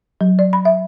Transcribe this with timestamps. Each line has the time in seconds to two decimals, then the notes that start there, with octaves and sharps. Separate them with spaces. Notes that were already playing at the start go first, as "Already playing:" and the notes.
0.21 F#3
0.39 D5
0.53 B5
0.65 E5